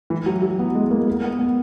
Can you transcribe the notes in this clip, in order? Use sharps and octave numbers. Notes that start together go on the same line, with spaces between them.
E3
F#3
F#3
B3
G#3
A#3
A#3
B3
B3